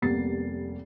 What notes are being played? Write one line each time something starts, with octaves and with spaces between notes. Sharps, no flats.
F1 G3 A#3 B3 A6 C7